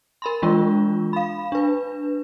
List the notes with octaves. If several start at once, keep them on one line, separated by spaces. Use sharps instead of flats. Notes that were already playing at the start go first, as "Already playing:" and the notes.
A#4 B5 C6
E3 G#3 D4 F4
F5 B5
D4 B4